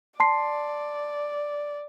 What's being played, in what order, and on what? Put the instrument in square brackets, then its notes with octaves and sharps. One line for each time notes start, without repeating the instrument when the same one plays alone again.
[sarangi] D5 [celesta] A5 C6 C7